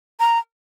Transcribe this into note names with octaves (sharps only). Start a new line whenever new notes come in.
A#5